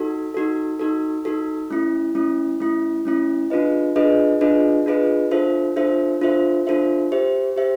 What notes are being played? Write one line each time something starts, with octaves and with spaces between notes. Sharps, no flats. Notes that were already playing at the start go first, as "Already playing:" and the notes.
Already playing: D#4 F#4 A4
D#4 F#4 A4
D#4 F#4 A4
D#4 F#4 A4
A3 C#4 E4
A3 C#4 E4
A3 C#4 E4
A3 C#4 E4
D4 F4 G#4 B4 D#5
D4 F4 G#4 B4 D#5
D4 F4 G#4 B4 D#5
D4 F4 G#4 B4 D#5
D4 F4 A4 C5 E5
D4 F4 A4 C5 E5
D4 F4 A4 C5 E5
D4 F4 A4 C5 E5
G4 C5 E5
G4 C5 E5